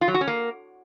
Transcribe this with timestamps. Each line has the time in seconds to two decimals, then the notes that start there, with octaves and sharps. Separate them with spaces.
0.01 F4
0.08 F#3
0.14 F#4
0.21 C#4
0.27 A#3